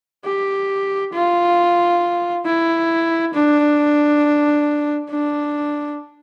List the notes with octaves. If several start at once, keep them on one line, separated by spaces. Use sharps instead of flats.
G4
F4
E4
D4
D4